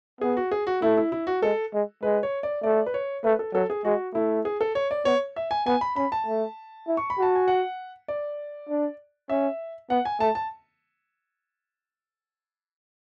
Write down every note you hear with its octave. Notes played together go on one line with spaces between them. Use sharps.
B3 G#4
F#4
G#4
F#4
A3 E4
E4
E4
F#4
G#3 A4
G#3
G#3 B4
C#5
D5
A3 D5
B4
C#5
A3 B4
A4
F#3 A4
G#4
G#3 F#4
A3 E4
G#4
A4
C#5
D5
B3 C#5
E5
G#5
B3 G#5
B5
C#4 B5
A5
A3
E4
C#6
B5
F#4 A5
G#5
F#5
D5
D4
C#4 E5
B3 F#5
G#5
A3 A5
A5